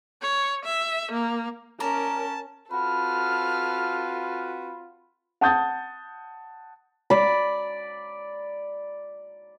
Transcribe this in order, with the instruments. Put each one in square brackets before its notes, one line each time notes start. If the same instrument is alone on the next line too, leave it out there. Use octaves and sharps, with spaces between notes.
[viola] C#5
E5
A#3
[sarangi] C#4 [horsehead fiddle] A#4 [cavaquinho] D5 A#5 [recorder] A5
[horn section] C4 F#4 B4 [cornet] F4 [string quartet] A4 F6 [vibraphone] B5
[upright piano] F#5 A5 D#6 G6 A6
[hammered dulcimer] D5 B5